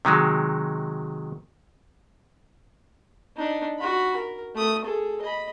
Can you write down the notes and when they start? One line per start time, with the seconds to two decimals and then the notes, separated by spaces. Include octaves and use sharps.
0.05 C3 D#3 F#3 G#3
3.36 D4 D#4
3.78 F#4 B5
4.16 A#4
4.55 A3 D#6
4.85 G#4 A4
5.22 D#5 B5